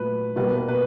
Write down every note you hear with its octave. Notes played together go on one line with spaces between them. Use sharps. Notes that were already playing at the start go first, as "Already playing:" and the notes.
Already playing: A#2 F#3 A3 B4
B2 G3 A#3 B4
B4
B4